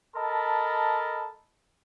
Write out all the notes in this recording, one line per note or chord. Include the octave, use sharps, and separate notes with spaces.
A4 A#4 D#5 A5 B5